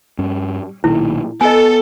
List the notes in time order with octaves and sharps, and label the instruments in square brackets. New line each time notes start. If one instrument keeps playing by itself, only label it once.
[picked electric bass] G2 C#4
[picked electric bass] B1 A#2 D#3 [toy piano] E4
[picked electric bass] B3 [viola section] A4 [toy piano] D#5 G#5